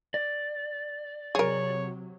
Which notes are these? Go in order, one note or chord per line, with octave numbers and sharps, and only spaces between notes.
D5
C3 F#3 G#4 A#4 C#5